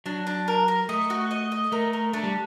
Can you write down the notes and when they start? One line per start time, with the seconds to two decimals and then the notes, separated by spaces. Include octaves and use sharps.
0.06 F#3 D4
0.27 D4
0.48 A#4
0.68 A#4
0.89 A3 D#5
1.10 F#4
1.31 D#5
1.52 D#5
1.72 A3 A#4
1.93 A#4
2.13 A3 D4
2.23 G3